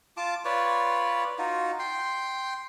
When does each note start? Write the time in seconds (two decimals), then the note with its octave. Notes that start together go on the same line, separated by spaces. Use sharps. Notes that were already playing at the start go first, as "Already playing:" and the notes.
0.17 F4 A5 D6
0.45 F4 B4 C#5 D5
1.38 D#4 F4 F#4
1.79 G5 C6